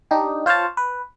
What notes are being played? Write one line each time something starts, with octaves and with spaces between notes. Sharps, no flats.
D4 D#4 G4
F4 C5 C#5 F5 A5
B4